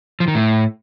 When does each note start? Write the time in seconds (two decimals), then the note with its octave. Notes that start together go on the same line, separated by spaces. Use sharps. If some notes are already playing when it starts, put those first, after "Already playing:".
0.20 F3
0.28 D#3
0.35 A2